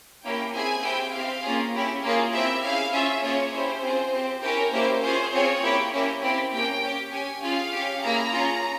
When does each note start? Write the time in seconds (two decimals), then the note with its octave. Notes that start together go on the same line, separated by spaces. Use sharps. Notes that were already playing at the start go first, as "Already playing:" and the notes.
0.24 A#3 C#4 E4 G4 G5
0.53 C4 E4 G#4 G#5
0.83 C4 E4 G4 G5
1.13 C4 G4 F5
1.43 A#3 C#4 F4 G#4
1.73 C#4 E4 G4
2.03 A#3 C#4 F4 G#4
2.33 C4 E4 G4 E5
2.63 C#4 E4 G#4 F5
2.93 C#4 F4 G#4 E5
3.22 A#3 C#4 F4 G#4 C#5
3.53 C#4 E4 G4 C5
3.83 C4 F4 G#4
4.13 C4 G4
4.42 C#4 E4 G4 A#4
4.73 A#3 C#4 E4 G4 C5
5.02 C#4 F4 G#4 C5
5.33 C4 F4 G#4 C#5
5.62 A#3 E4 G4
5.92 A#3 C#4 E4 G4
6.23 C4 E4 G4
6.52 A#3 C#4 G4 G5
6.82 C#4 G4
7.12 C#4 G4 G#5
7.42 C#4 F4 G#4 F5
7.72 C#4 G4
8.02 A#3 E4 G#4 A#5
8.32 C#4 F4 G#4